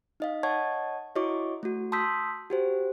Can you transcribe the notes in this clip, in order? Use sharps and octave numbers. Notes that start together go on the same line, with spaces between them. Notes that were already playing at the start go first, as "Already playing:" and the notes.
D#4 D#5 F5
C#5 D#5 F#5 A5 C#6 G#6
E4 F#4 C#5 D#5 C#6 D6
A3 F#4
A5 C6 D#6 E6 G6 B6
F#4 G4 C5